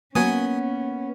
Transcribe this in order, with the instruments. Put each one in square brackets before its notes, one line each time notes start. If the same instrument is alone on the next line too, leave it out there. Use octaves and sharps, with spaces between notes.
[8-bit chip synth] F#3 G#5 D#6 [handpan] A#3 [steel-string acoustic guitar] B3 [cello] C#4